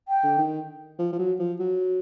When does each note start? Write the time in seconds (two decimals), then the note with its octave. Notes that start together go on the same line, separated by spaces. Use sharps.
0.08 G5
0.24 D3
0.38 D#3
0.99 F3
1.12 F3
1.19 F#3
1.39 F3
1.60 F#3